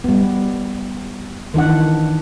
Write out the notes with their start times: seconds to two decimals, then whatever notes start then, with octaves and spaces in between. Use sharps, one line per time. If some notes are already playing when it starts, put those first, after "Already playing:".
0.04 G3 B3
1.54 D#3 E3 D4 F#5